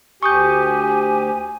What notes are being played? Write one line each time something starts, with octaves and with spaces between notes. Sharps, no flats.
D2 G4 G#5 C#6 D#6 G6